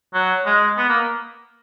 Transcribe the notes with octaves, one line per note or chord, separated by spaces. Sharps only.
F#3
G#3
B3
A#3